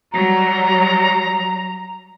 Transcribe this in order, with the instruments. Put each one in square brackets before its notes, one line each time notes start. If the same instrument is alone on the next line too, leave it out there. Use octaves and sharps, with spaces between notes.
[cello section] F#3 G3 [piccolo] A#5